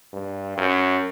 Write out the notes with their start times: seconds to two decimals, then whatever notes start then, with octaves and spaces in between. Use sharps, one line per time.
0.13 G2
0.57 F#2